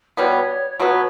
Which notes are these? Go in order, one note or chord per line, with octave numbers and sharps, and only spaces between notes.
B2 G3 B3 C#5
B2 F#3 B3